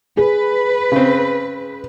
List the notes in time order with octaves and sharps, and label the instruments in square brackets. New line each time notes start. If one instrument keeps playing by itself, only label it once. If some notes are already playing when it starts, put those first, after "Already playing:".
[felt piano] G#4 [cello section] B4
[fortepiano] C#3 C4